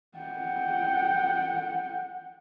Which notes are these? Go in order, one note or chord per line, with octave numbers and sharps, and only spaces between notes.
F#5 G5